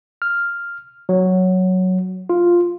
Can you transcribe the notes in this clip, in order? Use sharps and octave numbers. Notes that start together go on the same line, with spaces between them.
F6
F#3
F4